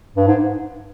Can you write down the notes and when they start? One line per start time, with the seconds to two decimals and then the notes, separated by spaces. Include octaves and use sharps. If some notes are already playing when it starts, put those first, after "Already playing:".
0.16 G2
0.27 G#2